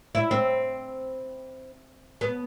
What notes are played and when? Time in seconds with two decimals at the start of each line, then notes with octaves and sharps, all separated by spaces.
0.15 E4
0.31 C4
2.21 B3